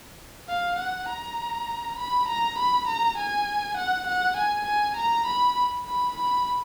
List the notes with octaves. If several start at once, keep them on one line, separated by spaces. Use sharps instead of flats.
F5
F#5
A#5
B5
A#5
B5
A#5
G#5
F#5
F#5
G#5
G#5
A#5
B5
B5
B5